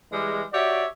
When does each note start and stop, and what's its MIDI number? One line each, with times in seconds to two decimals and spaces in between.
0.12 0.43 52
0.12 0.43 55
0.12 0.43 56
0.53 0.86 66
0.53 0.86 67
0.53 0.86 73
0.53 0.86 74
0.53 0.86 76